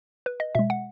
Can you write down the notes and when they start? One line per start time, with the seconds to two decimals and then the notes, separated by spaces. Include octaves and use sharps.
0.26 B4
0.40 D#5
0.55 B2 G#3 E5
0.70 F#5